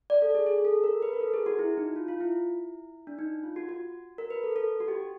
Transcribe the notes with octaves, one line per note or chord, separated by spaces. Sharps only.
D5
A4
G#4
G#4
A4
A#4
B4
A#4
A4
G#4
F#4
E4
D#4
F4
F4
E4
D4
D#4
F4
F#4
F#4
A#4
B4
A4
A4
F#4
G4
F#4